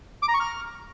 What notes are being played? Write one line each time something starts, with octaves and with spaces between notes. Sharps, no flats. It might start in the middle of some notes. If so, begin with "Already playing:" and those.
D6
A#5
C#6
F6